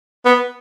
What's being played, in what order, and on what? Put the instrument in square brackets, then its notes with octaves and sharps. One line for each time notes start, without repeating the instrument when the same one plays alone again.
[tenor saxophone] B3